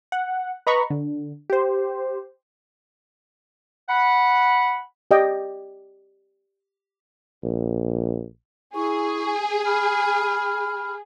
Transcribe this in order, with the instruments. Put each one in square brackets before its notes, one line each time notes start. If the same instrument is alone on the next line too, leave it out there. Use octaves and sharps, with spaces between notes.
[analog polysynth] F#5
B4 D#5 A#5 B5 C#6
D3
G4 C5
[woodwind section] F#5 B5
[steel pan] G4 D5 D#5 G5
[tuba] A#1
[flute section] E4 C#6 [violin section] G#4
[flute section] B5 F6